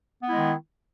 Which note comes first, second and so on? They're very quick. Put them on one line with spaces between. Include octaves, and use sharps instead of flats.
B3 E4 G#3 D#3